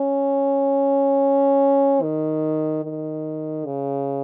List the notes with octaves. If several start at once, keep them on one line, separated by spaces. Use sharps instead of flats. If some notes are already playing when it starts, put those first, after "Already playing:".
Already playing: C#4
D#3
D#3
C#3